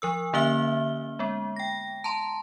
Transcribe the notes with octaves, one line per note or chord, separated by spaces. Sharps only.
F3 A#4 E6
D3 A#3 C#4 E5 F6 G7
G#3 B3
G5 A#6
A5 A#5 C6